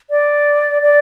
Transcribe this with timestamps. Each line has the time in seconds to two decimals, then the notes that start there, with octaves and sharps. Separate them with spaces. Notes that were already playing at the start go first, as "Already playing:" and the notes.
0.10 D5
0.82 D5